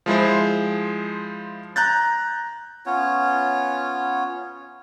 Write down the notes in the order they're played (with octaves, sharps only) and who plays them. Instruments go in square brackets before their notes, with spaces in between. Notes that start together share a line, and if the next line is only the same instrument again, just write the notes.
[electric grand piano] F3 G#3 E4 C5
A#5 F#6 G6 A6
[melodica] B3 C#4 F4 C#5